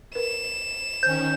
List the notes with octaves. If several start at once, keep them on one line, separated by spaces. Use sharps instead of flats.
A#4 B4 E7
D#3 C#4 C5 G6